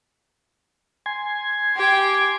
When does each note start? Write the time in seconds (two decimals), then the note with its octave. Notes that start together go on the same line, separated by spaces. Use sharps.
1.06 G#5 C6 G#6
1.76 G4 G5